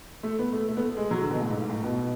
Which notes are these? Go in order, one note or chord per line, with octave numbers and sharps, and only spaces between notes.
A3
B3
A3
A3
B3
A3
G#3
F#3
D3
B2
A2
G#2
G#2
A2
B2